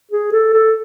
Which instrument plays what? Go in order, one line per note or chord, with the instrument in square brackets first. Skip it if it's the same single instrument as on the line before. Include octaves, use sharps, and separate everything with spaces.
[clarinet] G#4
A4
A4